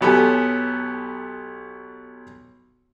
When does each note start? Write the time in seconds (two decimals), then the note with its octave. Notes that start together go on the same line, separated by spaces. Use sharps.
0.01 B1 F#3 B3 G4 A4 G#5